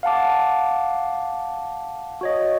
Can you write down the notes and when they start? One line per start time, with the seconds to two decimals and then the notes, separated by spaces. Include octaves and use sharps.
0.03 F5 F#5 A5 D6
2.21 F#4 C#5 D#5